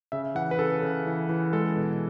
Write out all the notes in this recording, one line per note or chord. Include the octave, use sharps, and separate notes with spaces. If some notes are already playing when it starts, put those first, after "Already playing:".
C#3 E5
E3 F#5
B4
C#3 A4
C#3
E3
E3
G#3 A4
B2